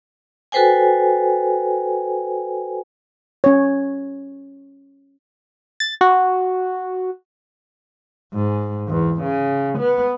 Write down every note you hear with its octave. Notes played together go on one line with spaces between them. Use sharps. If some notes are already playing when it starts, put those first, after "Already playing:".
F#4 A4 B4 C5 G5 G#5
C#4 C#5
A6
F#4
G#2
E2
C#3
B3